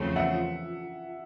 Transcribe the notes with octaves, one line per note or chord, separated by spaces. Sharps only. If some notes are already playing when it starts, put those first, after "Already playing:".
Already playing: E2 C#3 F3 A3 C4
E5 F#5